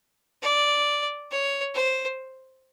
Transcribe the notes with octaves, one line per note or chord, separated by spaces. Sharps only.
D5
C#5
C5